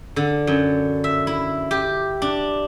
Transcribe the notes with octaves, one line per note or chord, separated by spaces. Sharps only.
D3
F#2
E5
E4
G4
D4